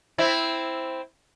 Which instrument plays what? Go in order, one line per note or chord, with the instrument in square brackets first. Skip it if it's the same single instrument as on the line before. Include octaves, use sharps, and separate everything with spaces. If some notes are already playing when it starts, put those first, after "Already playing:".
[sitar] C4 E4